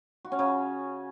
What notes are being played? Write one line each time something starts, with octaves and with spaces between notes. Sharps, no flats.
F#4
C#4
C#3